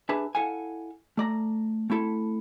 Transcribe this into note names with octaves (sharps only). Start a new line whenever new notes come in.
D4 G4 G#4 B4 E5
E4 A4 F5 F#5 G#5
A3 D5 A#5
A3 C4 E4 A4